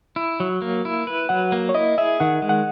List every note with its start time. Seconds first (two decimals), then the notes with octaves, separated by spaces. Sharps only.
0.16 E4
0.40 F#3
0.62 A#3
0.85 E4
1.07 B4
1.29 F#3 F#5
1.52 A#3
1.69 C#5
1.74 E4 D#5
1.98 G#4 E5
2.20 D#3 F#5
2.42 G#3
2.49 F#5